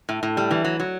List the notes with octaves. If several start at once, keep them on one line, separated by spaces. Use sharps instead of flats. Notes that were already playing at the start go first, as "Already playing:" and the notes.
A2
A2
G3
E3
F#3
F#3